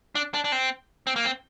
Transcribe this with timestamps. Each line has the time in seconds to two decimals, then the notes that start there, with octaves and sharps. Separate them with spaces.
0.15 D4
0.34 D4
0.44 D4
0.52 C4
1.07 C4
1.16 A#3
1.25 C4